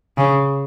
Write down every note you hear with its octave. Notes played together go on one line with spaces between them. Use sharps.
C#3